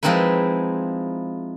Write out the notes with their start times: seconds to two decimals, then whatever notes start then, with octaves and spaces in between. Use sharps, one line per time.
0.03 F3 G#3 C4 D#4 E4 B4